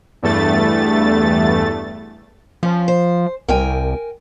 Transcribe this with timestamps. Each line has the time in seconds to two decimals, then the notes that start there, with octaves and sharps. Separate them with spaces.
0.22 E2 G2 A3 A6
2.63 F3 C#4
2.88 C5
3.48 C2 A#4 G5 G#5